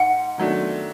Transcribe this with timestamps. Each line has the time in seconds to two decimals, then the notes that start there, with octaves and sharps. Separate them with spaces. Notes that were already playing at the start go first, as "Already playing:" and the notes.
Already playing: G#2 F#5
0.38 D#3 F#3 A3 D4